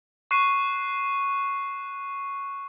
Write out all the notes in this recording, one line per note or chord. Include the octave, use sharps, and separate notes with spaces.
C#6 F#6 C7 D#7